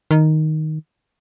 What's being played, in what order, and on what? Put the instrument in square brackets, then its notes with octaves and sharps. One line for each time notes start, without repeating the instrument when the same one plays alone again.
[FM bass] D#3